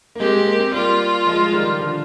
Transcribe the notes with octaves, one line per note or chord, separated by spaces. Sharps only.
A#3
G#3 C4 G4
A#3
C4
G3 A#3 F4
F3 G#3
G#3
D#3 G3
D3 F3